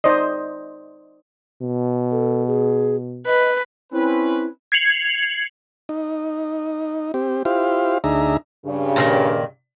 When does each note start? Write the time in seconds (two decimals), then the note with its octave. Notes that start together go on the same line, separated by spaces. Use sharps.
0.04 D#4 C5 D5 D#5
1.62 B2
2.11 A4
2.47 G#4
3.27 B4 D#5
3.92 C4 C#4 E4 B4
4.72 G#6 C7 C#7 F7 F#7
5.89 D#4
7.14 C4 G4
7.45 E4 F4 G4 C5 F5
8.04 D2 D4 D#4 G#4 E5 A#5
8.65 G2 C#3
8.96 A#2 D3 D#3